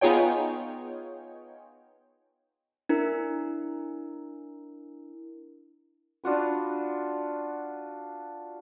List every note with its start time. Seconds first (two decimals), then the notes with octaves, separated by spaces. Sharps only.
0.01 B3 D#4 F4 G#4 C#5 G5
2.89 D4 E4 A#4
6.24 D4 F4 F#4 B4